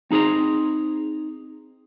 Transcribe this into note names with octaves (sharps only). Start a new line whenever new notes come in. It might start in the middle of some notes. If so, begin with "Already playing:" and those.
C4 D#4 G#4 C5 A#5